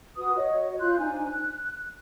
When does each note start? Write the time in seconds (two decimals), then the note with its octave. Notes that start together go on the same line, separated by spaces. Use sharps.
0.17 F#4 B4 D#6
0.36 F#4 C#5 D#5
0.80 F4 C6 F#6 G6
0.99 D4 D#4 C5 G#5
1.26 F#6